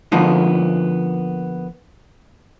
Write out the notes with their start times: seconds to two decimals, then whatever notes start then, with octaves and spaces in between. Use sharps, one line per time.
0.12 D3 F3 A#3 B3 D#4